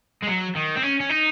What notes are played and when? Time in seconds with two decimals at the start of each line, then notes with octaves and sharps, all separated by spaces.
0.23 G#3
0.29 F#3
0.56 D#3
0.77 C4
0.83 C#4
1.01 C#4
1.10 D#4